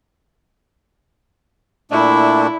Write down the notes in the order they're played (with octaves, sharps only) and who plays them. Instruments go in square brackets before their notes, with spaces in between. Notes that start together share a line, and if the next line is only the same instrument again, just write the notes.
[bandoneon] A#2 A3 D4 [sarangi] E4